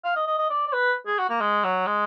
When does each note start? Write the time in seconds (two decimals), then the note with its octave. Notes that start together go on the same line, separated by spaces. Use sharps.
0.05 F5
0.16 D#5
0.27 D#5
0.38 D#5
0.50 D5
0.68 D5
0.73 B4
1.07 G#4
1.19 F#4
1.30 A#3
1.41 G#3
1.64 F#3
1.87 G#3